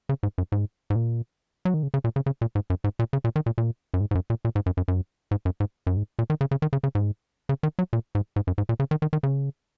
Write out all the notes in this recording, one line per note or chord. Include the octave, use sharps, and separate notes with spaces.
C#3
G#2
F#2
G#2
G#2
A#2
F#3
D#3
C#3
C#3
A#2
C#3
C#3
A#2
G#2
F#2
G#2
A#2
C#3
A#2
D#3
A#2
A#2
F#2
G#2
G#2
F#2
A#2
A#2
G#2
F#2
F#2
F#2
G#2
F#2
G#2
F#2
G#2
A#2
D#3
C#3
C#3
D#3
C#3
C#3
G#2
C#3
D#3
F#3
A#2
G#2
G#2
F#2
G#2
A#2
C#3
D#3
D#3
D#3
C#3